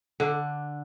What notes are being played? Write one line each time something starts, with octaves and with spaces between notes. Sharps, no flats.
D3 D4